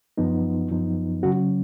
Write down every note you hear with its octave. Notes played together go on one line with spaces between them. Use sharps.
F#2 F3 B3 D#4
F#2 F3 B3 D#4
C#3 F#3 C#4 F#4